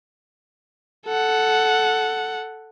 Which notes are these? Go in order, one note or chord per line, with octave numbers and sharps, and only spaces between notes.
A4 F#5